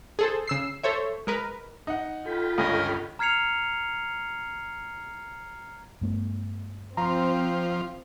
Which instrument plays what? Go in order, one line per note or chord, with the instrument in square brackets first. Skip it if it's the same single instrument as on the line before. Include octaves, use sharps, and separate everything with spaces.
[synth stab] G#4 A4 C5
C#3 E6 C7
A4 C5 C#5 E5
G#3 A#4 B4
[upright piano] D#4 F#5
[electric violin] F4 [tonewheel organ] A4 G5 B5
[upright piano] G1 C#2 G2 [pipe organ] C#4 A#4 D#5
[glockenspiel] A#5 F6 G#6 C7 C#7 F7
[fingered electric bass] G2 A3 B3
[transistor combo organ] F3 [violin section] C4 [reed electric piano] A#5 C6